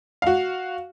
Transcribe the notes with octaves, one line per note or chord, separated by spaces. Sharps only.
F#4 F5